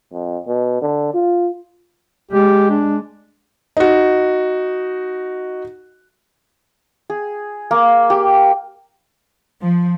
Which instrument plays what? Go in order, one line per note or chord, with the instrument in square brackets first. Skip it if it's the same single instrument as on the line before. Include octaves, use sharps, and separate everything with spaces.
[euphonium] F2
B2
D3
F4
[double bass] G#3 [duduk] G4
[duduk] D4
[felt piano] D#4 F#4
[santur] G#4
A#3
G4
[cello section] F3